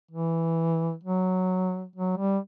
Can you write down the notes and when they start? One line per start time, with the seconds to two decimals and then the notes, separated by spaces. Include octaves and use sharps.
0.11 E3
1.04 F#3
1.96 F#3
2.18 G3